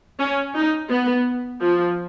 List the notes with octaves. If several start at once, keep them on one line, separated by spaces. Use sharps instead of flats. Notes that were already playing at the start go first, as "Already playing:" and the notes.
C#4
D#4
B3
F3